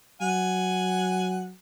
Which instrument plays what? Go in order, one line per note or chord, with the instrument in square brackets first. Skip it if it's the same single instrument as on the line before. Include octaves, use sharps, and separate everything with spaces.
[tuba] F#3 [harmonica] F#5 G#5